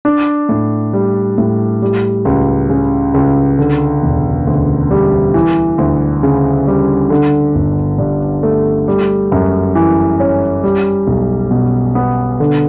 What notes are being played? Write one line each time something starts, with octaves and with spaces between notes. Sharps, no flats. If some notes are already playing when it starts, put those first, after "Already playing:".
D4
A2
G3
A2
G3
C#2
C#3
C#2
D3
E1
D2
G3
E3
D2
C#3
G3
D3
G1
G2
A3
G3
F#2
E3
C#4
G3
B1
B2
B3
D3